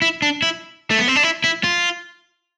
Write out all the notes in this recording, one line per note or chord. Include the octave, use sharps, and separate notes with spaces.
E4
D4
E4
A3
B3
C4
D4
E4
E4
F4